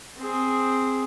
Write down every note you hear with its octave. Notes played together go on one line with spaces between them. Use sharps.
C4 G#4